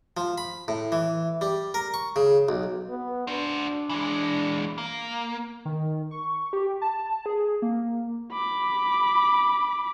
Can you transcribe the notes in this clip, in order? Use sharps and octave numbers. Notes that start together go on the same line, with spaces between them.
F3
B5
A2
E3
G3
A#4
C#6
C#3
B1
B3
D4 F#4 C5
E3 G#3
A#3
D#3
C#6
G4
A5
G#4
A#3
B5 D6